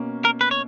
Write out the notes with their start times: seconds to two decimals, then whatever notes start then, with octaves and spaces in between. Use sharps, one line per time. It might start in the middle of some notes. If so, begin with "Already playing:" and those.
Already playing: B2 A#3 C#4
0.25 A#4
0.41 B4
0.51 C#5